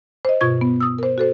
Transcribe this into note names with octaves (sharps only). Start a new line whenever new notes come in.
C5 D#5
G2 B2 F4 C#6 G#6
B3
D#6 E6
A#4 C5
F#4 A4 C5